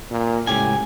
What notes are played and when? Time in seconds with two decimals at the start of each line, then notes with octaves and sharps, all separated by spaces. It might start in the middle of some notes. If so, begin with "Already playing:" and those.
0.11 A#2
0.47 C#2 A2 G4 G#5